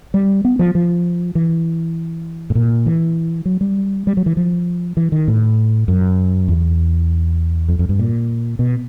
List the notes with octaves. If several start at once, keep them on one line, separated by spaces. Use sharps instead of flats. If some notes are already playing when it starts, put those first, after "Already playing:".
G3
B3
F3
F3
E3
A2
A#2
E3
F#3
G3
G3
F#3
E3
F3
E3
D#3
A2
F#2
E2
F2
F2
G2
A#2
B2